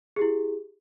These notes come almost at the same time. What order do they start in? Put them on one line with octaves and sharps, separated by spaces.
G#4 G4 E4